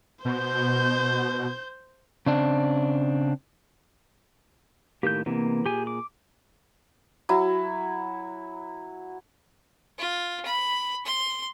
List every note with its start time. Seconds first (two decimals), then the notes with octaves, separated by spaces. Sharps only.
0.25 B2 C5 G6
2.26 C#3 C4 D4
5.03 A2 D#3 A#3 G4 G6
5.26 C3 E3 A#3 B3
5.66 A#2 G4 G#4 G#5
5.87 D6
7.29 F#3 E4
9.98 F4
10.45 B5
11.05 C6